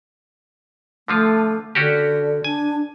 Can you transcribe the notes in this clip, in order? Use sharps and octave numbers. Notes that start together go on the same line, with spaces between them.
D3 F3 A3 F4
D3 C#4 F#4 G4
D4 G#5